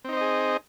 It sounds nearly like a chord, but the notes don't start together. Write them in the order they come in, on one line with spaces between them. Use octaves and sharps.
C4 D#4 C5 D#5 G#4